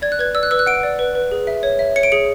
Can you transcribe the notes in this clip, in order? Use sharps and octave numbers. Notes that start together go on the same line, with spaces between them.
D5 G#6
F#6
B4 G#6
D5 E6
F#6
B4 E6
F#6
F#5 D7
D5
B4
B4
G#4
E5
C#5
E5
C#5 C#7
D7
G#4 C#7